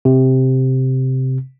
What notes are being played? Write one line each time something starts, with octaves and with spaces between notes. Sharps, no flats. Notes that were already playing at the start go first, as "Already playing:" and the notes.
C3